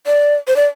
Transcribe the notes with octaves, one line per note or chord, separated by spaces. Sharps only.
D5
C5
D5